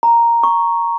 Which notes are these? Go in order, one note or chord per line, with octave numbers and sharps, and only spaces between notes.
A#5
C#6